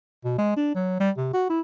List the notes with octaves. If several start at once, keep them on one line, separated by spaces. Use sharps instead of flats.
B2
G#3
D4
F#3
G3
C3
F#4
E4